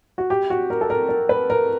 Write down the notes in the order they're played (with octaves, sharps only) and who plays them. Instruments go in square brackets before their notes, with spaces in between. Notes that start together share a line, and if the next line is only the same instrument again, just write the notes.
[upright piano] F#4
G4
F#4
A#4
A4
A#4
A#4
B4
A#4